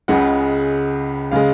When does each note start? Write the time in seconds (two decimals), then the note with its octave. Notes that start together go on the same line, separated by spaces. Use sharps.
0.08 C#2 C#3 G#3 F#5
1.32 C#3 G#3 F5